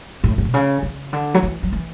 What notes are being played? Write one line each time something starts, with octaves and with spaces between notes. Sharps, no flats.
A2
A2
B2
C#3
C#3
D3
F#3
E3
F#3
E3